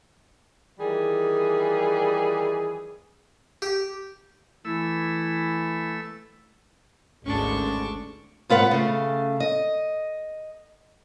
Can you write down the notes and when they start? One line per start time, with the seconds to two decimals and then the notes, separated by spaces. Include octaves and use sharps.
0.79 D#3 E3 G3 G#4
3.62 G4
4.65 E3 A3 E4 E6
7.26 G#1 D2 G#3 C#4 D4 A4 C#6
8.50 G#2 F4 B4 F#5
8.71 C#3 A3
9.40 D#5